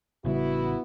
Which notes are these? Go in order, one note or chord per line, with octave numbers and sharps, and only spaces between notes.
A1 C#3 G3 B3 E4 F#4